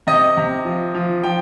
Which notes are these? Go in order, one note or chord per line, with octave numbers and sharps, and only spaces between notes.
C3 D#5
C3
F3
F3
F3 G5